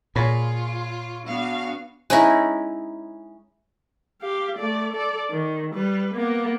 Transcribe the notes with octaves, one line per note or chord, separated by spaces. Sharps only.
A#2 F4 G#4 C#5 B5
B3 D4 F#4 F5
G#3 C#4 D#4 E4
G4 F5
A3 D5
A4 D5
D#3
G3 B4
A#3 B3